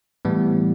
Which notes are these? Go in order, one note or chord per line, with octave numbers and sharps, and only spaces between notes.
A2 E3 G3 B3